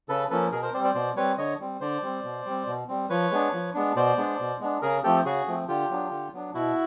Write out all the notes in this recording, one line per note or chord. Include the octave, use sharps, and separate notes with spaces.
C#3 A4 B4
F3 A#3 C#4 A4 B4
B2 G#4 A#4
A#4 C5
G3 C4 C5 D5
C5 D5
B2 C5 D5
G3 C4 B4 C#5
D3 C#5 D#5
G3 C4
D3 C5 D5
G3 C4
B2
G3 C4
B2
G3 C4
F3 B4 C#5
G#3 B3 D4
F3
G#3 B3 D4
B2 C5 D5
G#3 B3 D4
B2
G#3 B3 D4
C#3 G#4 A#4
F3 A3 C4 G4 A4
C#3 F#4 G#4
F3 A3 C4
D3 F4 G4
F#3 B3 D4
D3
F#3 B3 D4
B2 E4 F#4